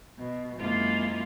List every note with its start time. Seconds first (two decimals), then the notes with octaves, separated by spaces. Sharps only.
0.19 B2
0.60 F#2 C3 G#3 A#3 E4 F4